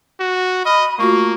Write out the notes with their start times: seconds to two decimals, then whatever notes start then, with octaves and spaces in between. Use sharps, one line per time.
0.20 F#4
0.66 D#5 B5 F6
0.99 A3 A#3 F4 F#4 C#6